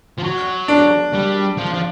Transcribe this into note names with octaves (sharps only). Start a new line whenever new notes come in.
F3
F#3
D4
G3
F3
F3